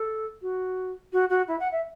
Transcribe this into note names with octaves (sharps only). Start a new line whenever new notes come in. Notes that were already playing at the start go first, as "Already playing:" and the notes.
Already playing: A4
F#4
F#4
F#4
E4
F#5
E5